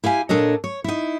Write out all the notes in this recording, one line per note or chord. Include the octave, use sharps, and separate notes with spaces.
E4 G4 F5 G#5
A#2 D4 A4 C#5 D#5
C#5
D#4 E4